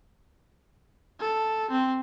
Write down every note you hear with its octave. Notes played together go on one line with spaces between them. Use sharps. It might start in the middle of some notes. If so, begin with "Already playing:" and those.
A4
C4